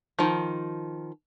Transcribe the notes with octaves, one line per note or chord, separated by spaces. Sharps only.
D#3 F3